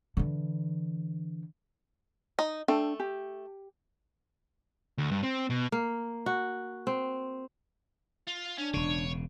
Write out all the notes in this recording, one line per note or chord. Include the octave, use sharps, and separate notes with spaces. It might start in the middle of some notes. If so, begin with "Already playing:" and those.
D3 E3
D#4
A3 D4 A4 G5
G4
D2
G2
C4
B2
A#3
F#4
C4
F4
C#4 D4
E1 C#3 C#5